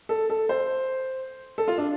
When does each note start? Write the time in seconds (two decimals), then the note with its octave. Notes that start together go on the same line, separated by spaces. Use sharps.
0.09 A4
0.30 A4
0.49 C5
1.58 A4
1.68 F4
1.78 D4